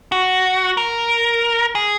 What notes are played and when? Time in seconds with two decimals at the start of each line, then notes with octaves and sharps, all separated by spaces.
0.12 F#4
0.77 A#4
1.75 G#4